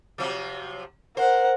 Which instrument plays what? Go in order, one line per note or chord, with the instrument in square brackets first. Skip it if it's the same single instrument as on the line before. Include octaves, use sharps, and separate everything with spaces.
[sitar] C3 F3 F#3
[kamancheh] A#4 F#5 [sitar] C5